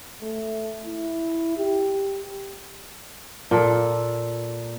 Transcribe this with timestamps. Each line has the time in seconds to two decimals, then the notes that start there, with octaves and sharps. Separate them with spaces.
0.22 A3
0.85 E4
1.58 G4
3.51 A#2 A4